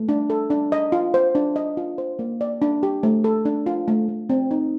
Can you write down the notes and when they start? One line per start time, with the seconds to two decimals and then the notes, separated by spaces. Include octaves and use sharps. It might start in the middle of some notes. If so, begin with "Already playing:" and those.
Already playing: A3
0.09 D4
0.30 A4
0.50 D4
0.72 D#5
0.92 F4
1.14 C5
1.35 D4
1.56 D#5
1.77 F4
1.98 C5
2.19 A#3
2.41 D5
2.62 D4
2.83 G4
3.03 A3
3.24 A4
3.45 D4
3.66 F4
3.88 A3
4.09 A3
4.30 C4
4.51 D#4